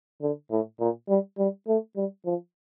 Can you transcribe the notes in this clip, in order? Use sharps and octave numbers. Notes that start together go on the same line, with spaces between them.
D3
A2
A#2
G3
G3
A3
G3
F3